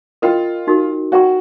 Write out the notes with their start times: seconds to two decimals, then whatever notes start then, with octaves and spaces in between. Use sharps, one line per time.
0.22 F4 A#4 D#5 G5 B5
0.67 D#4 F#4 A#4
1.12 F#4 B4 D5 G5 A#5 C#6